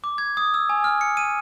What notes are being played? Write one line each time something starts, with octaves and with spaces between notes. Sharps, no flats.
D6
G#6
D#6
E6
G#5
F6
C#7
D#7